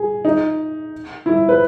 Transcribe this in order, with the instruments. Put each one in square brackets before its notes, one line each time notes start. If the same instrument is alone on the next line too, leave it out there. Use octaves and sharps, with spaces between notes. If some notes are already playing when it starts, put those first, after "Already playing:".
Already playing: [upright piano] G#4
D#4
E4
B4